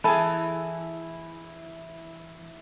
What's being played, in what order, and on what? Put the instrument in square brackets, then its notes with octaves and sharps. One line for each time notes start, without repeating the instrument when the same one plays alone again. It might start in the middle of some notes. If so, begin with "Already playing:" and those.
[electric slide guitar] E3 G#5 [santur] E4 [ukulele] G#4 A4 [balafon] B5